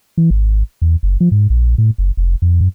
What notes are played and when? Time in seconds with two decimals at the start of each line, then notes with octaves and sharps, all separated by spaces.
0.17 E3
0.30 G#1
0.82 E2
1.03 F#1
1.20 F3
1.32 G#2
1.50 A#1
1.78 A2
1.98 F#1
2.17 F1
2.42 F2
2.61 F#2